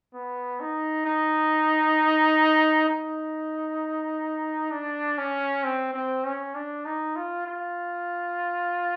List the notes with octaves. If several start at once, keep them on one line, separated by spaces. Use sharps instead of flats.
B3
D#4
D#4
D#4
D4
C#4
C4
C4
C#4
D4
D#4
F4
F4